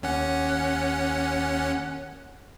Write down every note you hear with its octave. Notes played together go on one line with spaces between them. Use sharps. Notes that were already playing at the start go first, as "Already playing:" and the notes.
D#2 C#4 F#5